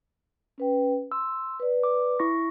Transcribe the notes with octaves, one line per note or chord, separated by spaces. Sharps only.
C#4 B4 G5
C6 E6
B4 D5
D6
E4 C#6 A#6